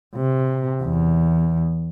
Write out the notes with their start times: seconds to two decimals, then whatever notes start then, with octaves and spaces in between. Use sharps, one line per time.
0.15 C3
0.82 E2